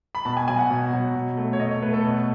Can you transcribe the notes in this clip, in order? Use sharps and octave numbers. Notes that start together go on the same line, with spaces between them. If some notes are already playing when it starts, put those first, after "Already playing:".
B5
B2 A5
G#5
F#3 G#5
F#5
B2
F#3
B2
A3
C#5
B2 D#5
C#5
A3 B4
A4
B2